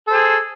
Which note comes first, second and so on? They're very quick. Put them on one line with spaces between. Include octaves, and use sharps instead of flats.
A4 C5 G#4